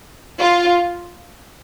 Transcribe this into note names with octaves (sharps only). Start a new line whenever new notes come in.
F4